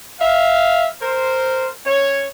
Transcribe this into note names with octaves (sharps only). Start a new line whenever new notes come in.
E5 F5
A#4 C5
C#4 C#5